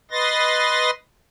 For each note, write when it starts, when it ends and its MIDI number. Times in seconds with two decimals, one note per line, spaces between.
0.11 0.90 71
0.11 0.90 75
0.11 0.90 84
0.11 0.90 93
0.11 0.90 94